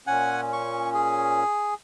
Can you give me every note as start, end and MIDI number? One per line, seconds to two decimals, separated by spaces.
0.07 1.44 46
0.07 1.44 61
0.07 0.41 78
0.07 0.41 80
0.53 0.90 85
0.94 1.74 68